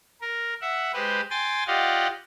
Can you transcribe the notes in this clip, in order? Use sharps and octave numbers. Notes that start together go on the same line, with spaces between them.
A#4
E5 F#5
G#3 G4 B4 C5
G5 G#5 C6 A6
F4 G4 D5 D#5 F5 F#5